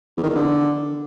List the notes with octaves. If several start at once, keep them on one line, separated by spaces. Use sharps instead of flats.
E2
D#3
E2
D3